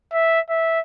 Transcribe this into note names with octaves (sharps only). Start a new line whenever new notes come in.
E5
E5